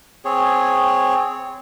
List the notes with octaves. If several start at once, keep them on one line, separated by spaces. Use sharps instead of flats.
C4 G#4 C#5